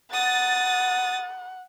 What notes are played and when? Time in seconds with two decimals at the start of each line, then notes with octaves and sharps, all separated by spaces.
0.13 F#5 D#6 A6